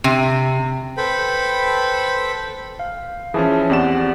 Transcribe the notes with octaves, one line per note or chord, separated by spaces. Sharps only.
C3
A4 B4 C5 G5 B5
F5
E3 F3 C#4 G#4 E5 A5
E2 C4 G4 D5 F#5 E7